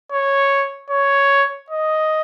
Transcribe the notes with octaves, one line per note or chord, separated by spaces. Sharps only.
C#5
C#5
D#5